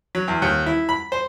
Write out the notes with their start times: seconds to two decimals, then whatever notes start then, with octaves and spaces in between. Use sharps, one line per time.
0.15 F#3
0.28 E2
0.42 D#2
0.66 E4
0.89 B5
1.12 C5